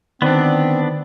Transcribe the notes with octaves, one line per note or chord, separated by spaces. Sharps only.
D2 D#3 B3 C4 D4 D5